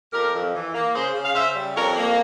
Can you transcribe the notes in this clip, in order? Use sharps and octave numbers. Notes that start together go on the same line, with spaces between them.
F2 G4 A#4
F2
E3
A#3
C#3 G#4 C5
C#3
F5
C#3 C5 E5
G3
F2 A#4 C#5
A#3